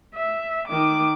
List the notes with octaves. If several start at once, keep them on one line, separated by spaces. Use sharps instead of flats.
E5
D#3 D6